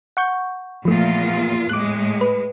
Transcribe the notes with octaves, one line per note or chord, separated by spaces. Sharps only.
F#5 C#6 G6
E2 A#2 F3 A3 F4
A2 G#3 D6 F#6
B4